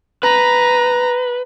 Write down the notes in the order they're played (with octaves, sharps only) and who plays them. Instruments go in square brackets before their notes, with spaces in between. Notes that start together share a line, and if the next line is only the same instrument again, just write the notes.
[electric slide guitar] B4 [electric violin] A#5